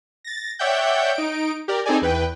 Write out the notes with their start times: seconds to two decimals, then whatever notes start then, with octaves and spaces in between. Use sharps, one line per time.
0.25 A6 A#6
0.59 C#5 D5 E5 F#5 G5 G6
1.14 D#4 D7
1.68 G4 A#4 D5
1.85 C4 D#4 G#4 A4 D5 G#5
2.02 E2 B4 G5